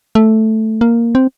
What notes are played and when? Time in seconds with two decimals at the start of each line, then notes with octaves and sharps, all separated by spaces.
0.15 A3
0.81 A#3
1.15 C4